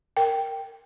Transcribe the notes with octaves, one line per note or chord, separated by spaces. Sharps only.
A#4 G5